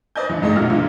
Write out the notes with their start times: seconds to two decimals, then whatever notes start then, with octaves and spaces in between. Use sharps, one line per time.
0.16 B4 C5 D5 D#5 G#5 G6
0.29 G2 D3 E3
0.42 A1 G#2 G#3 A3 G#4 D#5
0.56 B1 E2 A#2 F#4 F6
0.70 B1 A#2 D3 E3